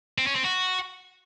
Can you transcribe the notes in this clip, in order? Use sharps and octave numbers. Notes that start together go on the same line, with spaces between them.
C4
C#4
C4
F#4